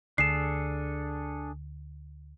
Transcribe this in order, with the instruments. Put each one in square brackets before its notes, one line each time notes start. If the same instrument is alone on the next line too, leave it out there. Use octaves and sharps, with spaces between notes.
[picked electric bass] D2 [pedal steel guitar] D4 G#4 A4 [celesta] C7 E7